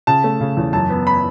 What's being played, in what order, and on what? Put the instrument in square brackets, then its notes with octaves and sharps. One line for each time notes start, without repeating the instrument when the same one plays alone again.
[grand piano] C#3 A5
A3
C#3
E2
F#2 A5
B3
B5